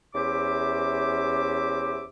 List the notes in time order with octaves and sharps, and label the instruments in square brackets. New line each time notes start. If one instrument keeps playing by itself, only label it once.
[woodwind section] E2 C#4 G4 C5 E5 D6